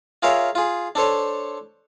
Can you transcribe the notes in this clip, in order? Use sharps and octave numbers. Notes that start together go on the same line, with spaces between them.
F4 G#4 A#4 C#5 E5 F5
F4 G#4
D4 A4 C5 C#5